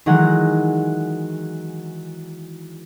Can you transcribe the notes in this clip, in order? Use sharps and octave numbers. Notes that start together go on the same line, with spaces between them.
D#3 E3 F#3 G#3 F#5